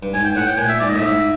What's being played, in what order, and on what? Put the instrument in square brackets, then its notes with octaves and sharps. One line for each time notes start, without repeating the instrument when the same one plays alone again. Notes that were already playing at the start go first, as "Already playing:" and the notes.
[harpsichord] G2
[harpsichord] G#2 [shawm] G#5
[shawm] G5
[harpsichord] A2 [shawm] F#5
[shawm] G5
[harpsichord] A#2 [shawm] G#5
[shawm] E5
[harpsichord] G#2 [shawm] D5
[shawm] D#5
[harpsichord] A2
[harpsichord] G#2 [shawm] E5